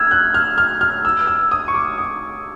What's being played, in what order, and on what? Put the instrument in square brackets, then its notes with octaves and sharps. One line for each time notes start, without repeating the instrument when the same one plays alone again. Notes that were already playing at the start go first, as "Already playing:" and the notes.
Already playing: [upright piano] E6 F6 [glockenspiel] G#6
[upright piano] F#6
F6
F6
F6
E6
E6
D#6
C#6
D6
D#6